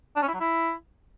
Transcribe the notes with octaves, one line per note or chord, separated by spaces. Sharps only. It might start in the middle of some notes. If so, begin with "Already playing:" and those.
D4
C#4
E4
F#3
E4